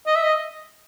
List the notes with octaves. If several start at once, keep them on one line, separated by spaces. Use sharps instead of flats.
D#5
E5
D#5